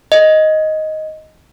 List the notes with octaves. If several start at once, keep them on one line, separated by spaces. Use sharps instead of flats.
D#5